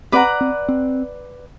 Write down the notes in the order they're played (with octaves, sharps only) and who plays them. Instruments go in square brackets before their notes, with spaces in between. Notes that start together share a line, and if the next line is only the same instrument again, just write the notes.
[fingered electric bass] C4 [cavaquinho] B4 D5 F#5 A#5
[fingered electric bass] C4
C4